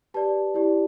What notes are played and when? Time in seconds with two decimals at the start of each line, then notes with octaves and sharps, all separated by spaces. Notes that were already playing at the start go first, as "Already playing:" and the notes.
0.14 G4 B4 D5 A5
0.54 E4 G4 D5